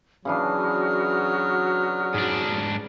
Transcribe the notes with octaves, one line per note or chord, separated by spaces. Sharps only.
C#3 E3 F#3 D4 F#4 D#6 F6
G#2 D4